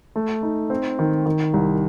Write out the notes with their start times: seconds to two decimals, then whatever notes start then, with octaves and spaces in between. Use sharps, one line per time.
0.16 A3
0.43 D#4
0.70 C4
0.99 D#3
1.26 D#3
1.54 C2